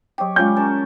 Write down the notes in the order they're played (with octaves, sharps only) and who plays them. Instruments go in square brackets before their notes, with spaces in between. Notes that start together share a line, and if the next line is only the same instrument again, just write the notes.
[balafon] F#3 G5 [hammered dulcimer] G4 C#5
[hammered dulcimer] G3 C#4 [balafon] G#3 F4 G5 [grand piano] G6
[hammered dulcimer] C#4 A#4 A5